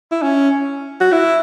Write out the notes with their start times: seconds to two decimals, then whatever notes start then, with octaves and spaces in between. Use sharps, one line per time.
0.11 E4
0.22 C#4
1.01 F#4
1.12 E4